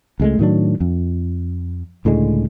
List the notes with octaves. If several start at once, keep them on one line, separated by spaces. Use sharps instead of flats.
C#2 G#3 A3
A2 D#3 F#3 D4
F2
C#2 A2 D3 G#3